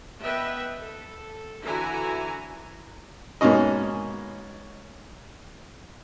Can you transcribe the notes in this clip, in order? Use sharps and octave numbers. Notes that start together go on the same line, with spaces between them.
B3 B4 D#5 E5 G5
A4
D3 E3 E4 F#4 G#5 A#5
G#2 B2 A#3 C#4 D#5